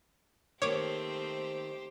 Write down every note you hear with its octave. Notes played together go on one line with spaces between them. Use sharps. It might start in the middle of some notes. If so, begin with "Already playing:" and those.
D#3 A3 A#3 C4 G4 C5 C#5 D6